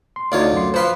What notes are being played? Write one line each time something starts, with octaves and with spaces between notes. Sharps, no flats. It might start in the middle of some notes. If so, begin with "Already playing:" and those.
C6
D2 D#4 F4 C#5 D5
F#2 C6
F3 B4 C5 F5 C6